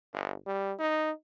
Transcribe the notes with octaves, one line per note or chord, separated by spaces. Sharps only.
G1
G3
D#4